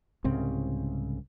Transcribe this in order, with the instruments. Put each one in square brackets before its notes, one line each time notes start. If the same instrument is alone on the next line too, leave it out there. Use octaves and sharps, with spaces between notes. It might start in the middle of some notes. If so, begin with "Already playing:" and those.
[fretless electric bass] C2 G#2 C#3 C4